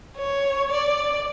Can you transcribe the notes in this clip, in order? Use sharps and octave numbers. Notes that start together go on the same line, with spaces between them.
C#5
D5